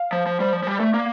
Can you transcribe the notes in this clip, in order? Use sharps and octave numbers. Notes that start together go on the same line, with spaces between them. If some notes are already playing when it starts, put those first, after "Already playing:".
Already playing: F5
F3
F3
G3 C5
F3 D5
F3
G3
A3
A#3